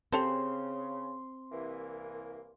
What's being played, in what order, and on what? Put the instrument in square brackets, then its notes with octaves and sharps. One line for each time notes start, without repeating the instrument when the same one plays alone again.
[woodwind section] C#3 [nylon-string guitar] C4 [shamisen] G4 A4 C5 [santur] C6
[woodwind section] C2 E3 A#3